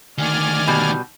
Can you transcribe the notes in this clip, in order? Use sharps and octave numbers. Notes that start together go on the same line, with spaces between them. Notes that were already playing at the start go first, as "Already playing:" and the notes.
D2 D#3 D5 G#5 F6
B2 G3